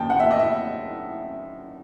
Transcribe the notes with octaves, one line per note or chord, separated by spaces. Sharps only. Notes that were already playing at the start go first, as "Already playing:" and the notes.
Already playing: F#2 D#3 G5 A5
F#5
E5
D#5
E5